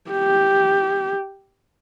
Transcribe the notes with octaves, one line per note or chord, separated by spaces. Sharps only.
G4